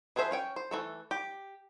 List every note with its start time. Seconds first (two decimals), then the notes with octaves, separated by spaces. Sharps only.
0.16 E3 G#4 A4 C5 E5
0.31 C#4 C#5 G5
0.56 C5
0.71 E3 A3 A4
1.11 G4